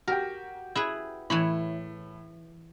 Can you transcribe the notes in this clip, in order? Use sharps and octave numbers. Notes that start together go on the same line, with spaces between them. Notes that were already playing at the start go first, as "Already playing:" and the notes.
F#4 G4 A#4 G5
E4 G#4 B4
A2 E3 C#5 B5